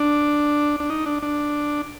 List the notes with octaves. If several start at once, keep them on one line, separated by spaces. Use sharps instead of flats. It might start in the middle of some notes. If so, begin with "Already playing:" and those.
Already playing: D4
D4
D#4
D4
D4